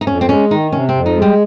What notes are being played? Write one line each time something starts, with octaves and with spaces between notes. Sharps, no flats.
D#4
F2 C#4
C4
G#3 C#4
D#3 D#4
C3 C#4
C4
F2
D#4
G#3
G3